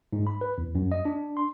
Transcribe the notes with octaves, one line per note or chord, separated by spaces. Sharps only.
G#2
B5
B4
E2
F#2
D#5
D4
C6